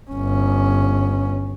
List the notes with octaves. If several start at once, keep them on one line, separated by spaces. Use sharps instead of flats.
G1 C#4